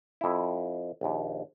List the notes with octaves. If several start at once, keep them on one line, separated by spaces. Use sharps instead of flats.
F2 E4
A#1 D#2